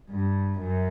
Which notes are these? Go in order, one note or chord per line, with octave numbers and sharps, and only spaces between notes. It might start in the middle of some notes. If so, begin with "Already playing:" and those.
G2
F#2